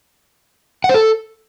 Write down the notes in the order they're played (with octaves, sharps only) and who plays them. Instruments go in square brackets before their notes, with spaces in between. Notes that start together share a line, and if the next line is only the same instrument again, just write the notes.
[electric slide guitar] F#5
C5
A4